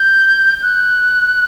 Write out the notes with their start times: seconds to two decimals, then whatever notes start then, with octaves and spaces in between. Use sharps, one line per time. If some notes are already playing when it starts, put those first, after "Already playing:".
Already playing: G6
0.62 F#6